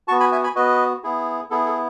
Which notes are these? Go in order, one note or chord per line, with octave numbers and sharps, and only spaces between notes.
B3 F#4 A5 C#6
G#5 B5
E5 G#5
G#5 B5
B3 F#4 B4 D#5
B3 E4 G#4
B3 E4 G#4 A4
A4